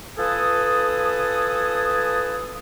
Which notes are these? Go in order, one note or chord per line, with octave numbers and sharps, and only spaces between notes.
F4 A4 B4 G#5 A5 D#6